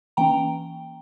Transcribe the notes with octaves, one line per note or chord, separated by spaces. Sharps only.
E3 A#3 C#4 G5 A#5